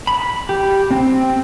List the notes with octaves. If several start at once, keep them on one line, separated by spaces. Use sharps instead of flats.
B5
G4
C4